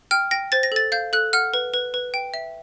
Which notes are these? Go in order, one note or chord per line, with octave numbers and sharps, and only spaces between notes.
G5 F6
G5 A#6
C5 A6
A#6
A4 A6
F5 G6
A4 F#6
F#5 F6
B4
B4
B4
G5
E5